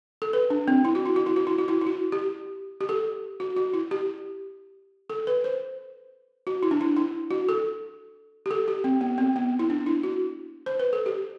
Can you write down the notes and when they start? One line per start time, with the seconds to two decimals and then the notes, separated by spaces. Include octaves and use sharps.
0.22 A4
0.33 B4
0.50 D4
0.68 C4
0.85 E4
0.95 F#4
1.06 E4
1.16 F#4
1.26 E4
1.36 F#4
1.47 E4
1.58 F#4
1.68 E4
1.81 E4
1.86 F#4
2.12 G4
2.81 G4
2.89 A4
3.40 F#4
3.56 F#4
3.73 E4
3.91 G4
5.10 A4
5.27 B4
5.44 C5
6.47 F#4
6.63 E4
6.71 D4
6.81 E4
6.97 E4
7.31 F#4
7.49 A4
8.46 G4
8.51 A4
8.68 G4
8.84 C4
9.01 B3
9.18 C4
9.36 B3
9.59 E4
9.70 D4
9.86 E4
10.03 F#4
10.66 C5
10.80 B4
10.93 A4
11.06 G4